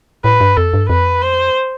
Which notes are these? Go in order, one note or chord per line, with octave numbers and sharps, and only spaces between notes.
A2 B4
G2
F2 A4
G2
F2 B4
C5